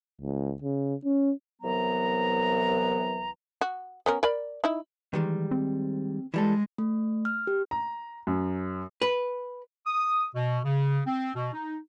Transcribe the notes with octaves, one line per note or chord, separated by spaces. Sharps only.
C#2
C#3
C#4
C2 E3 F#3 B3 A#5
F#4
B3 C#4 A#4
A#4 D5 B5
D#4 E4
D#3 E3 G3 G#3
C4
E3 G3 G#3 A4
A3
F6
G4
A#5
F#2
B4
D#6
B2
C#3
C4
B2
D#4